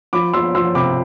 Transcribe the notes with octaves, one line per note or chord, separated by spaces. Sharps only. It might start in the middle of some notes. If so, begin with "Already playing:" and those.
F3 B5 D6
F3 C6 E6
F3 C6 E6
C3 B5 D6